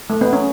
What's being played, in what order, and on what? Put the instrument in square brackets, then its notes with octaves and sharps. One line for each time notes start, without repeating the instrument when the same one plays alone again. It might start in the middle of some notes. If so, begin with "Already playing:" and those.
[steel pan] A3
B3
C#4